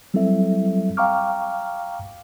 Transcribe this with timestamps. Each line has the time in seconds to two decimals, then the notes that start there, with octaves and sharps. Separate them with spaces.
0.14 F#3 G3 C4 E4 A4 E5
0.97 F5 G5 A#5 C#6 D6 F6